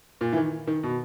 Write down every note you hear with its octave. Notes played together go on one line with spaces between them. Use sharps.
A#2
E3
D#3
D#3
B2